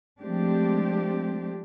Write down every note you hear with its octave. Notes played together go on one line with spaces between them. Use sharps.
F3 G#3 A3 C4 D4 G4